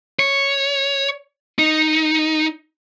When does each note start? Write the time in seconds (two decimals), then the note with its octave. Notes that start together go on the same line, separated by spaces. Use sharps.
0.19 C#5
1.59 D#4